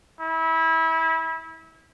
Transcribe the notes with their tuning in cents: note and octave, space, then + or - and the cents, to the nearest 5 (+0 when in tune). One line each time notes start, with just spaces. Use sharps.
E4 -25